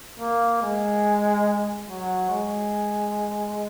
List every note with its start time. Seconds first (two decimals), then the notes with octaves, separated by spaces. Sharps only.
0.20 A#3
0.62 G#3
1.88 F#3
2.30 G#3